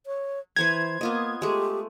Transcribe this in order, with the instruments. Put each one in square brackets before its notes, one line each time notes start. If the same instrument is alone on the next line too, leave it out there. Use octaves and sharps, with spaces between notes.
[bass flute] C#5
[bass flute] E3 [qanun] B4 C5 A#5 [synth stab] G#6
[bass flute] A#3 [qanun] B3 F4 D#5
[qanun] G#3 A3 [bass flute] G4